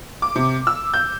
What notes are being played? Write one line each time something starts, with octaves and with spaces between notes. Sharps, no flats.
D6
C3
E6
G6